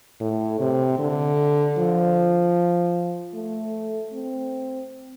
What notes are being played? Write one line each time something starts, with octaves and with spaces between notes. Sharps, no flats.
A2
C3
D3
F3
A3
C4